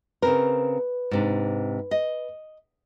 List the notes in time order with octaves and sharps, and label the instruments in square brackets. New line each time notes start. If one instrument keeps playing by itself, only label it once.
[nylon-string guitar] C#3 C4 A#4 [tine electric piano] B4
[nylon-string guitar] G#2 C3 D4
D#5